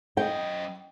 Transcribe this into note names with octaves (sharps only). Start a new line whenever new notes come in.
F#2 D#5 G5